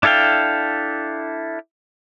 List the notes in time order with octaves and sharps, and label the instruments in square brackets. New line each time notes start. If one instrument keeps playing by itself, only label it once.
[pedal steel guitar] D4 E4 A4 F5 G5